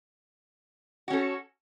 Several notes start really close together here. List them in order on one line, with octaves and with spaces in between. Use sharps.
F#4 C#4 A4